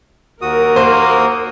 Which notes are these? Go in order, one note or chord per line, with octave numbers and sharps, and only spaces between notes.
D#2 F#4 A#4 D#6
A#3 C5